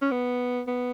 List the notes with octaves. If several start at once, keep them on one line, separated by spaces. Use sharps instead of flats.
C#4
B3
B3